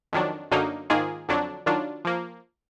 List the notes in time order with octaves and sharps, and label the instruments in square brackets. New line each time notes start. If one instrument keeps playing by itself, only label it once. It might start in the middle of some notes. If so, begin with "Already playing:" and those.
[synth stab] F2 D#3 F#3 D4
F#2 D3 F#3 A#3 D#4
G#2 D#3 A#3 F4 G#4
F2 D3 F#3 D4
D#3 F#3 D4 F4
F3 A#3